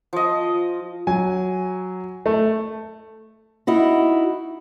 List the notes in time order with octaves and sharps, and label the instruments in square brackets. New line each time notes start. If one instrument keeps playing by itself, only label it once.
[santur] F3 D#5
[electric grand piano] F#3 [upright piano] G#5
[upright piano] A3
[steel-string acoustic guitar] D#4 E4 F#4